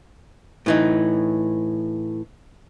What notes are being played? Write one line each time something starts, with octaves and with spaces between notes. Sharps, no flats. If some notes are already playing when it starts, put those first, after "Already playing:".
A2 E3 D#4